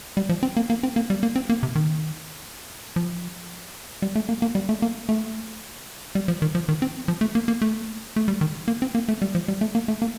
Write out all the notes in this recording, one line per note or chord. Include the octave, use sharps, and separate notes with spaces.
G3
F3
C4
A#3
A#3
C4
A#3
G3
A#3
C4
A#3
C3
D#3
F3
G3
A3
A#3
A#3
G3
A3
A#3
A3
G3
F3
D#3
F3
D#3
C4
F3
A3
A#3
A#3
A3
A3
G3
D#3
A#3
C4
A#3
A3
G3
F3
G3
A3
A#3
A3
A#3